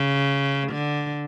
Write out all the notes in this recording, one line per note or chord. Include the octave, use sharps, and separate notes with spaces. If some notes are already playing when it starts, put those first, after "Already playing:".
Already playing: C#3
D3